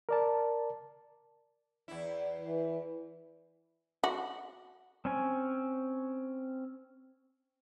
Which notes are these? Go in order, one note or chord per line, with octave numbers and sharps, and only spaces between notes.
A#4 D5 A5
E2 E4
E3
F#4
C4 C#4 C#5 G#5